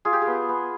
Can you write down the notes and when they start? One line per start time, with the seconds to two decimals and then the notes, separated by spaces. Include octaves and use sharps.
0.05 F4 G#4
0.13 G4
0.22 G#4
0.27 B3
0.49 B3